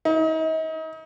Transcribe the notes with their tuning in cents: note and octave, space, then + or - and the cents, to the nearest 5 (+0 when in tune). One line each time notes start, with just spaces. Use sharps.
D#4 +40